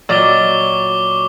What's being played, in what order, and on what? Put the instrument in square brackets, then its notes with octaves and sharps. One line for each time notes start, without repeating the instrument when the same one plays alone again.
[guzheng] A#2 F#3 [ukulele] D5 D#5 [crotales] C#6 D6 G7